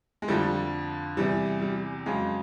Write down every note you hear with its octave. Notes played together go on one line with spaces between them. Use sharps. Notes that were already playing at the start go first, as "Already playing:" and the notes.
G#3
F2 D3 F3 G3 A3
E2 C3 E3 G3
G3
F2 C#3 F#3 G#3